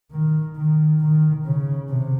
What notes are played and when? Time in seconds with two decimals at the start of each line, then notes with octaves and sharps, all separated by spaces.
0.11 D#3
0.56 D#3
1.01 D#3
1.45 C#3
1.89 C3